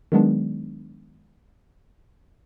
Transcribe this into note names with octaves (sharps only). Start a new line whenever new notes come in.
D#3 F#3 G#3 B3 D4